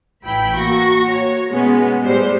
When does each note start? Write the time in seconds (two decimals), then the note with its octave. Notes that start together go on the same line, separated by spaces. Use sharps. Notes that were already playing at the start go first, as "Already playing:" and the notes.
0.24 A1 E4 G5 B5
0.56 A#3 F#4 C#6 A#6
1.08 F#4 C#5
1.50 B2 G#3 B3 C#4
2.03 A2 G3 G#3 C5